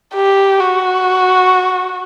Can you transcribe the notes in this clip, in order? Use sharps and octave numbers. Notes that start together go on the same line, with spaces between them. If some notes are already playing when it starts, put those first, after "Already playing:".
G4
F#4